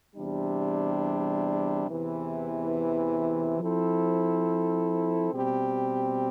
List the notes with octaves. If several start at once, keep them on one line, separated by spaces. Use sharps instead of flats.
E2 C3 G3 D4
E2 C3 E3
F3 C4 E4 A4
B2 G3 C4 G4